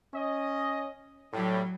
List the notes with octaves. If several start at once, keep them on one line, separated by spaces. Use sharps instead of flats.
C#4 D#5
A2 F#3 G3